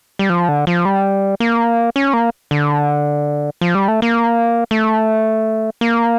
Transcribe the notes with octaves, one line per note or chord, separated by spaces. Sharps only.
G3
F3
D3
F3
G3
A#3
C#4
A#3
D3
F3
G3
A3
A#3
A3
A#3